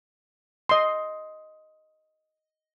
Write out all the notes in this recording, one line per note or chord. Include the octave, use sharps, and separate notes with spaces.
D#5 C6